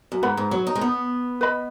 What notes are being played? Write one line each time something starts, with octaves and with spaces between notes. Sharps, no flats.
F#2
G#2 B4 F#5 B5
G#2
F#3
D#4
G#3
B3
B4 D#5 B5